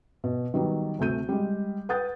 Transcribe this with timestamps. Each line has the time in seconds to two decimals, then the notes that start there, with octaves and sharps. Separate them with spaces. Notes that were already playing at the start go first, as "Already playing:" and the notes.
0.24 B2
0.54 D#3 F#3 G3 B3
0.99 D2 C3 A3 G6 D#7
1.29 G3 G#3
1.89 B4 F#5 G5 D#6 G6 A6